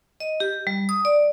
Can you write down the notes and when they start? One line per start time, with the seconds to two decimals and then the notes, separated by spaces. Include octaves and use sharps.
0.20 D#5
0.40 G4
0.67 G3
0.89 D#6
1.05 D5